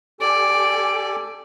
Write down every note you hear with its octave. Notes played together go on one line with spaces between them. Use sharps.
G4 A4 D5 G#5 D7